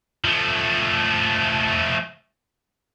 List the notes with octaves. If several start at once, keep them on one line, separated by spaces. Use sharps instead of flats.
F3 A3